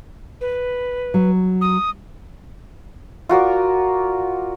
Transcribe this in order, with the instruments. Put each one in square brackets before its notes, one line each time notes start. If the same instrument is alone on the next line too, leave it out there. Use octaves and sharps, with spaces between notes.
[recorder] B4
[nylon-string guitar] F#3
[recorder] D#6
[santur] F4 F#4 A#4 D5